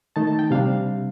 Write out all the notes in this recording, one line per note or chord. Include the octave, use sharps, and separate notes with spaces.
D#3 A3 D#4 A5
A5
G5
C3 G3 D4 F5